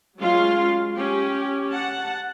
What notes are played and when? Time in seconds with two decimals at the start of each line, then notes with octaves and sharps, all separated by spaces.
0.19 F#3 G#3 C#4 F4 F5 C6
0.96 C#4 G4
1.70 F#5 A5